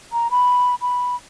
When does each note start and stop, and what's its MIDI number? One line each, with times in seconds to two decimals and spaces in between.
0.12 0.31 82
0.31 0.75 83
0.82 1.16 83